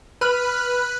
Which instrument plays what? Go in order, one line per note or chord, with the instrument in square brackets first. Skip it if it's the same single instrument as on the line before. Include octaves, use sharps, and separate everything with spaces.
[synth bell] B4 B5 F6 F#6